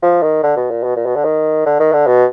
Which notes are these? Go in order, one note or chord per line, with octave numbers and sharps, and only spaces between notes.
F3
D#3
D3
B2
A#2
B2
A#2
B2
D3
D#3
D3
D#3
D3
B2